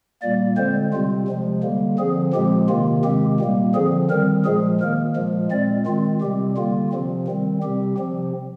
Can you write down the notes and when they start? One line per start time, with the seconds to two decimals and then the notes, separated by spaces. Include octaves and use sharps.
0.22 A#2 G3 A#3 D5
0.57 D3 G#3 C4 C5
0.93 C3 G3 C4 F4
1.28 C3 F3 G#3
1.64 D3 G3 A#3
1.99 D3 F3 C4 G#4
2.34 A#2 F3 G#3 C4 G4
2.69 C3 D#3 A#3 F4
3.04 C3 D#3 G#3 C4 G4
3.40 A#2 G3 A#3
3.75 D3 F3 C4 G#4
4.10 D#3 G3 C4 A#4
4.45 A#2 F3 G#3 G#4
4.81 D#3 A#3 A#4
5.16 A#2 F3 G#3
5.51 A#2 G#3 C4 D5
5.87 D#3 G#3 C4 F4
6.22 C3 G3 C4 G4
6.57 D3 G3 A#3 F4
6.92 C3 F3 C4
7.28 D#3 G3 C4
7.63 C3 G3 C4 G4
7.98 C3 F3 C4